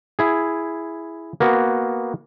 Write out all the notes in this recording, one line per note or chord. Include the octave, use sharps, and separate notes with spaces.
E4 G#4
A#3 B3 F#4